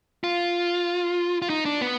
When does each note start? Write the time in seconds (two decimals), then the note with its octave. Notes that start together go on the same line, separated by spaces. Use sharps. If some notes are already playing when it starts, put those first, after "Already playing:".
0.24 F4
1.42 F4
1.50 D#4
1.65 D4
1.81 B3